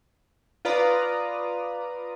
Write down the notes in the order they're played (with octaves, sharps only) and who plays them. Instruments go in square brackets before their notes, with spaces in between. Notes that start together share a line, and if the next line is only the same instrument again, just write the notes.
[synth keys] F4 B4 D5 A#5 D#6